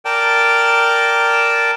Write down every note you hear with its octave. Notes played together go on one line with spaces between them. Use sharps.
A#4 D5 G5 A5